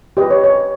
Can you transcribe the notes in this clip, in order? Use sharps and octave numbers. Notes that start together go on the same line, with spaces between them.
G4 B4 D#5
C#5
C#5